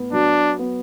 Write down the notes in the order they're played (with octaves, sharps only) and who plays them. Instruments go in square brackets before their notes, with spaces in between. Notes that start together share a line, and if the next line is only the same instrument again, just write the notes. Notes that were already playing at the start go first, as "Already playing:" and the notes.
Already playing: [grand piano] A2 B3
[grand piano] F#3 [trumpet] D4
[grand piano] B3